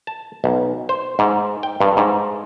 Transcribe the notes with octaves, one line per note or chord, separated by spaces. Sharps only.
A5
B1
C5
G#2
G5
G2
G#2